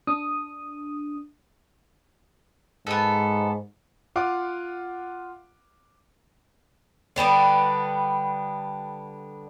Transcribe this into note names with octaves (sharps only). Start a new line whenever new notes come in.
D4 D#6
G#2 B3 A4
F4 F5 F#5 D6
D3 G3 B3 D4